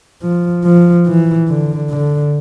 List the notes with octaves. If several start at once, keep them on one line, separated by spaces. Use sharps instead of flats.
F3
F3
E3
D3
D3